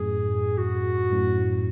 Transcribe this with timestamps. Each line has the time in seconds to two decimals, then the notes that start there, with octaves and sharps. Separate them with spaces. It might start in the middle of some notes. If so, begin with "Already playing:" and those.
Already playing: F#2 A2 G#4
0.58 F#4
1.11 F#2 A2